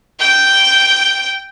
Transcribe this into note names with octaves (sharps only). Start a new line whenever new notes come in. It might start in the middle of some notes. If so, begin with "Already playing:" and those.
G5 G6